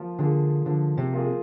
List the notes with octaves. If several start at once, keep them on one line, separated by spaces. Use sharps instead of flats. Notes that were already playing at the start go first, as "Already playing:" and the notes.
Already playing: F3 A#3 F4
D3 A#3 F4 G#4
D3 F3
C3
A#3 F4 G#4